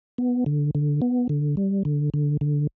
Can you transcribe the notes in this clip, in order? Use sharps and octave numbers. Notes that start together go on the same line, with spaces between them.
B3
D3
D3
B3
D3
G3
D3
D3
D3